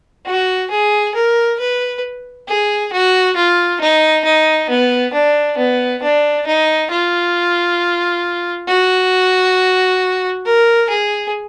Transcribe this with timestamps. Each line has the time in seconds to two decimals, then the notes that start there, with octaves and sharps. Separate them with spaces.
0.26 F#4
0.71 G#4
1.15 A#4
1.60 B4
2.48 G#4
2.93 F#4
3.36 F4
3.81 D#4
4.25 D#4
4.70 B3
5.13 D4
5.58 B3
6.02 D4
6.47 D#4
6.91 F4
8.68 F#4
10.46 A#4
10.89 G#4